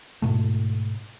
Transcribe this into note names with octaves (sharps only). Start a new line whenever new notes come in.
G#2 B2 A3